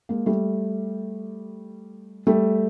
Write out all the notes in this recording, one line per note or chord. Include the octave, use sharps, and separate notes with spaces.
G#3 A#3
G3 A3
G3 A3